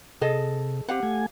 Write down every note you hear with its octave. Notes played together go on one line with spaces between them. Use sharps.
C3 G#4 A4 D#5
C4 G4 F5 F#5
A3 G#5